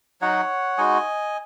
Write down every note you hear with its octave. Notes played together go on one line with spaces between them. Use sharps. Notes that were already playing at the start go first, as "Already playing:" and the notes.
F#3 D#4 F#4 C#5 F#5
G#3 D#4 F#4 D#5 G#5